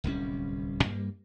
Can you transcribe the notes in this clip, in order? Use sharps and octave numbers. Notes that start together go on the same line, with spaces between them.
D1 C2 G3 C#4
G2 G3 A#3